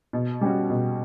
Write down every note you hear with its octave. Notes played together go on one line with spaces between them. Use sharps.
B2
G3 C#4 F#4
B2